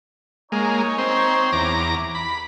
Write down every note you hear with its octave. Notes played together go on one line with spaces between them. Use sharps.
G#3 A#3 D#4 C#5
C4
E2 A#5 D6
B5